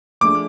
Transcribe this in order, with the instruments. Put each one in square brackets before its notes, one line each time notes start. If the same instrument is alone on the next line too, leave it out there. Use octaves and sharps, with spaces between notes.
[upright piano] F3 A3 D4 G#4 [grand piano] D6